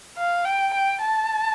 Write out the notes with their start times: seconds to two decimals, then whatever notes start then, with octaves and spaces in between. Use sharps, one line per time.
0.17 F5
0.45 G5
0.73 G5
1.02 A5